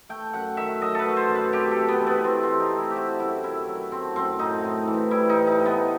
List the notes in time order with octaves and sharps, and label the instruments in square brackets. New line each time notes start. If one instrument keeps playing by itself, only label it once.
[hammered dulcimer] A3 G5
F#2 F#5
D#3 E5
F#3 D#5
A4 B4
A3
C5
F#2
B4
C3 G4
A4
C3
B3
E3
B3
A3 C4
C4
C3
D#4
C3
E4
G4
A3 F#4
F#2 E4
D#3 E4
F#3
A3 C4
F#2 C4
A2 D#4
A2
E3
G3 E4
D#4
A2
D#4
A2
B3